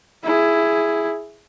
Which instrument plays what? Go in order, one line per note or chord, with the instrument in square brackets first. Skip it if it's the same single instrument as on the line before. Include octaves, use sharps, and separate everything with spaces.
[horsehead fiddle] E4 G#4